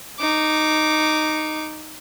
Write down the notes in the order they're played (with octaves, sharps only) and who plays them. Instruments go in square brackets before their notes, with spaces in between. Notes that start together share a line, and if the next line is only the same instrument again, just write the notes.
[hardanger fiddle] D#4 D6